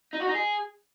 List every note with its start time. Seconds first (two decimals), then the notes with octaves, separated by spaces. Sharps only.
0.13 D#4
0.20 F#4
0.27 D#4
0.34 G#4